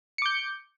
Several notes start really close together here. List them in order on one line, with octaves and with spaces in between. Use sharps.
C#7 D6 G6